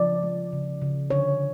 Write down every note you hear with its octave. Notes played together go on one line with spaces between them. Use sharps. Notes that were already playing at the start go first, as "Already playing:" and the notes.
Already playing: C#3 F3 D5
G#3
C#3
C#3
D3 C#5